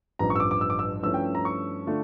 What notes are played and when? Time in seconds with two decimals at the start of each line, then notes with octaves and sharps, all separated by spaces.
0.19 A1 G2 F3 A#5
0.30 C#6
0.35 E6
0.40 D6
0.51 D6
0.61 E6
0.70 D6
0.79 E6
1.03 G2 F3 A3 C#4 E4 E6
1.14 G5
1.35 A#5
1.45 C#6
1.87 D3 A3 D4 F4